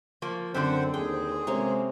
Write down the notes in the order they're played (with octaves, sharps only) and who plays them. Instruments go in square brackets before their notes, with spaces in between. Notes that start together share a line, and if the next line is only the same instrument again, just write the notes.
[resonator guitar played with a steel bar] F3 A#3
[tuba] F#2 [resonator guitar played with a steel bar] D3 C4 [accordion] C5 F#5 [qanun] B5
[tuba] D#2 [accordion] G#4 [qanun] G5
[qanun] C3 A#3 C#4 [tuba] G#3